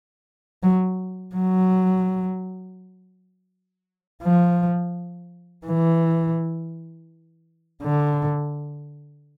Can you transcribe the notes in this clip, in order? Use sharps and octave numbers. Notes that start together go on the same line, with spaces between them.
F#3
F#3
F3
E3
D3